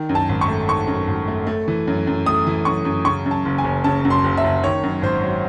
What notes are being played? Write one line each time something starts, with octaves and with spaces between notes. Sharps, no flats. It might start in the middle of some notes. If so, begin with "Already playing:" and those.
Already playing: D#3
F#2
A5
G#1
C#6
A3
D#3 C#6
F#2
G#1
A3
A3
E3
F#2
F#2
A3 D#6
E3
F#2 C#6
F#2
C#3 C#6
F#2
A5
F#1
G#5
F#1
C#3 A5
F#2
C6
F#1
E5
F#1
D#3 C#5
F#2
G#1 C5
F#3